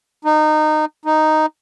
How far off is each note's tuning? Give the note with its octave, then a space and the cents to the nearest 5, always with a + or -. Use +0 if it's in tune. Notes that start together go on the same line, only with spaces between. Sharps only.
D#4 -20
D#4 +0